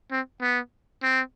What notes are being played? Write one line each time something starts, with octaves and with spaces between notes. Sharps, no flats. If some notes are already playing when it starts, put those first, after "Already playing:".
C4
B3
C4